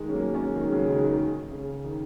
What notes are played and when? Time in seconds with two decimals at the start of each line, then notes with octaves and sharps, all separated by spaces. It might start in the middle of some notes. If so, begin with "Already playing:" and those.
Already playing: D#3 G#3
0.09 C#4
0.13 F#3 A#3
0.35 G#3 C#4
0.55 D#3 G#3
0.71 C#3 F#3
0.87 D#3 G#3
1.03 D#3 G#3
1.52 C#3
1.84 D#3